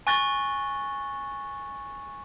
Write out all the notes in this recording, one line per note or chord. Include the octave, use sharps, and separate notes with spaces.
G#5 C#6 F#6 A6 A#6 G7